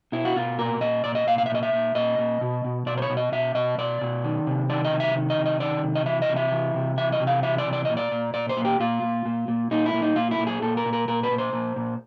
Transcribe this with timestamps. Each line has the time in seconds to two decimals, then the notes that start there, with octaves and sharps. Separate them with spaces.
0.12 B2 E4
0.25 F#4
0.36 B2 F4
0.59 A#2 A#4
0.81 A#2 D#5
1.04 A#2 D5
1.15 D#5
1.27 A#2 F5
1.38 F5
1.46 E5
1.50 A#2 D#5
1.63 E5
1.73 A#2
1.95 A#2 D#5
2.18 A#2
2.41 B2
2.64 B2
2.86 B2 D5
2.97 C5
3.02 C#5
3.10 B2
3.17 D#5
3.32 B2 E5
3.55 B2 D#5
3.78 B2 D5
4.01 B2
4.24 D#3
4.47 C3
4.70 D#3 D5
4.85 D#5
4.91 C3
5.00 E5
5.15 D#3
5.30 D#5
5.38 C3
5.46 D#5
5.60 D#3 D5
5.83 C3
5.95 D#5
6.06 E3 E5
6.22 D#5
6.29 C3
6.36 E5
6.52 E3
6.75 C3
6.97 E3 E5
7.12 D#5
7.20 C3
7.27 F5
7.43 E3 E5
7.58 D5
7.66 C3
7.73 D5
7.85 A#2 D#5
7.97 D5
8.11 A#2
8.34 A#2 D5
8.49 C5
8.57 A#2
8.65 G4
8.80 A#2 F4
9.03 A#2
9.26 A#2
9.48 A#2
9.71 A#2 D#4
9.86 E4
9.94 A#2
10.02 D#4
10.16 A#2 F4
10.31 E4
10.39 A#2
10.47 G#4
10.62 A#2 A4
10.77 A#4
10.86 A#2
10.93 A#4
11.08 A#2 A#4
11.23 B4
11.31 A#2
11.38 C5
11.53 A#2
11.76 A#2